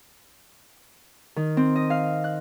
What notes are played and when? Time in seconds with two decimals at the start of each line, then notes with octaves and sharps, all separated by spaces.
1.36 D#3
1.57 C4
1.76 D#5
1.90 F5
2.24 F#6